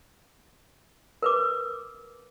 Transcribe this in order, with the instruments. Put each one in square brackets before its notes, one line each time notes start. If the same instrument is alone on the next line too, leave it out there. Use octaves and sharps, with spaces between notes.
[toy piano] A#4 B4 D6